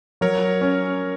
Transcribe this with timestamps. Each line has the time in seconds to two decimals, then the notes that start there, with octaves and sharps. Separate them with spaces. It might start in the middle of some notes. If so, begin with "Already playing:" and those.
0.21 F#3 A#4 C#5
0.61 C#4